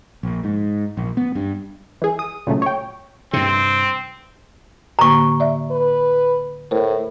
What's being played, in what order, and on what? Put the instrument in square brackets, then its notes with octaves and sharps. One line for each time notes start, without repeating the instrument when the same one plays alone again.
[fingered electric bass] A#1
G#2
A#1
B3
G2
[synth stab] E3 G#4
D#6
A#2 C#3 F#3 A3
C#5 G5
[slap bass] G2 C3 [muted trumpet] C4
[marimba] A2 D3 A#3 [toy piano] A#5 C#6
[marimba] D5 E5
[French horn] B4
[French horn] A2 [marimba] A#4 C5